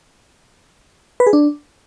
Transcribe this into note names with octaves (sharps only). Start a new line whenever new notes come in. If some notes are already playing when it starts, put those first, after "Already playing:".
B4
G#4
D4